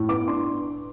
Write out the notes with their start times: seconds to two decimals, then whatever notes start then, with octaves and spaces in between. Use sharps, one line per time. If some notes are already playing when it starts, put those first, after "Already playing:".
Already playing: A2
0.09 B3 D6
0.27 D4 C6